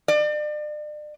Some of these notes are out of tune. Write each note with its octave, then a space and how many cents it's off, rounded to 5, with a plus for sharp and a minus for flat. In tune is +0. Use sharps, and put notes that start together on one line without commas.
D5 +35